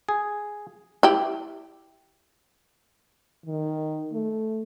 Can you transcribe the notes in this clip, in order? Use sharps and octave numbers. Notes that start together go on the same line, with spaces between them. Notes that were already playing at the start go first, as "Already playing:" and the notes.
G#4
E4 G4
D#3
A3